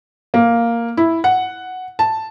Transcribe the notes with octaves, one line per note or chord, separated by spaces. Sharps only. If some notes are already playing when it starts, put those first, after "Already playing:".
A#3
E4
F#5
A5